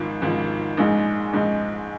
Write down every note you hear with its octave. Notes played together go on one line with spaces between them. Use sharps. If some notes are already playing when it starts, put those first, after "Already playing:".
Already playing: G#1 G#2 F3
G#1 G#2 F3
A#1 G#2 G#3 D#4
A#1 G#2 G#3 D#4